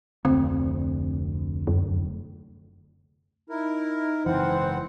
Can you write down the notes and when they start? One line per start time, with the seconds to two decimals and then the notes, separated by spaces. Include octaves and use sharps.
0.25 F1 D2 C4
1.67 F#2
3.50 D#4 E4 A#4
4.26 F#1 G#2 E3 C4 C5 F#5